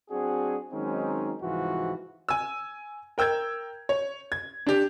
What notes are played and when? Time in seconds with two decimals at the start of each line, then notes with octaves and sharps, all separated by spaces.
0.10 F#3 C4 D4 F#4 G#4
0.72 D#3 F#3 G#3 C4 C#4 D#4
1.42 C2 G#2 E3 F3 F4 F#4
2.29 G#5 E6
3.18 A#4 G5 E6 G6 G#6
3.89 C#5
4.32 G#6
4.67 D4 G4